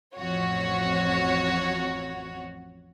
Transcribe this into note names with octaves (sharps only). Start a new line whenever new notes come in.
A1 F2 F#4 C#5